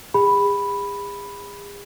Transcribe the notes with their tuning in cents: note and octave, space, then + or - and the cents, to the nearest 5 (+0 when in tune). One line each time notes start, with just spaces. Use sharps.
G#4 -40 B5 +0